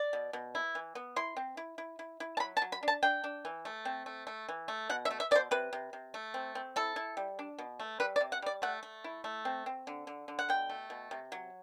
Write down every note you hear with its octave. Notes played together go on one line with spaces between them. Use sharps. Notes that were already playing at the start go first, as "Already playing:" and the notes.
Already playing: D5
B2
B2
E4
E3
B3
E4 C6
C4
E4
E4
E4
E4
A5
F#3 B5
A5
F#3
B5
D4
A5
D4 G5
D4
E3
A3
C4
A3
A3
E3
A3
B2 F#5
E5
A3
E5
B2 C5 D5
C3 B4
C3
C3
A3
C4
C4
E4 A4
E4
G3
D4
B2
A3
G3 B4
D5
C3
F#5
G3 D5
A3 F#5
A3
E4
A3
C4
C4
D3
D3
D3
F#5
B2 G5
A3
B2
C3
F#3